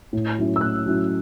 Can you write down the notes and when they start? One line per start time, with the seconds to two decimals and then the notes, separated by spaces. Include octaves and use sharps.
0.13 A2
0.38 F#3 C#4 E4
0.56 E6
0.61 A2 F#6
0.85 F#3 C#4 E4